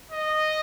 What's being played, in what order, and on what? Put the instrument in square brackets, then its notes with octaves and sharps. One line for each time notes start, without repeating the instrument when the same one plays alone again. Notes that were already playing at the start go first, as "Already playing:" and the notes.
[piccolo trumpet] D#5